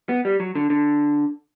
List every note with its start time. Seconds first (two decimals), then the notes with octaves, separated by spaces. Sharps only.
0.09 B3
0.25 G3
0.40 F#3
0.55 D3
0.70 D3